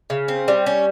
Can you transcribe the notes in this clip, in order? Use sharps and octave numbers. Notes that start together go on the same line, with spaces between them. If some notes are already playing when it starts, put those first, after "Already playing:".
C#3
C4
G3
C#4